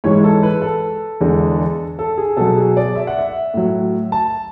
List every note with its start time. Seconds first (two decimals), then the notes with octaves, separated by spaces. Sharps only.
0.04 G#2 E3 G#3 C#5
0.24 A4
0.43 B4
0.62 A4
1.21 E2 D3 G#3
1.99 A4
2.18 G#4
2.37 B2 F#3 A4
2.57 G#4
2.77 D5
2.96 E5
3.07 F#5
3.19 E5
3.54 A2 F#3
4.12 A5